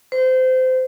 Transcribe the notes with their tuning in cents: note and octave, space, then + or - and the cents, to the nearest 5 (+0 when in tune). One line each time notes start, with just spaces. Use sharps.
C5 -25